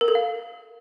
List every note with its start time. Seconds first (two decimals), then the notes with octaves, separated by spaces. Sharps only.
0.01 A#4
0.08 A4
0.15 F5